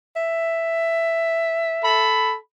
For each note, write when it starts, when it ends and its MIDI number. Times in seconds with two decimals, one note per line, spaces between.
0.16 2.10 76
1.83 2.37 69
1.83 2.37 83